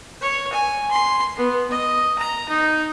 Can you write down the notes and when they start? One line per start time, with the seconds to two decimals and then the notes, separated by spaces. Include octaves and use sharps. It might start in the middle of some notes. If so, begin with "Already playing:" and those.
0.21 C#5
0.53 G#5
0.91 C6
1.37 B3
1.70 D#5
2.18 A#5
2.48 D#4